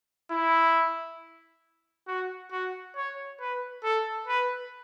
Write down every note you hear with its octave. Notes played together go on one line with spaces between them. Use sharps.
E4
F#4
F#4
C#5
B4
A4
B4